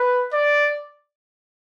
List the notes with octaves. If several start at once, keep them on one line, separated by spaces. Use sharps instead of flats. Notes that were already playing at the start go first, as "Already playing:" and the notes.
Already playing: B4
D5